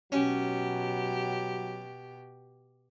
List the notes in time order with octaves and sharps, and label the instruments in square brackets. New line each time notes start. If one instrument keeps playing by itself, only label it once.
[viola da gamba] B2 G4 [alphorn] F#3 [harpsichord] C#4